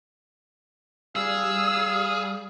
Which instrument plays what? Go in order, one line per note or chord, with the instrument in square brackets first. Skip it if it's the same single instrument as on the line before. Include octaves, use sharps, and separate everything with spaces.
[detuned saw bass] G3 [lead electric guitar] G#4 [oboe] F5 [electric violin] E6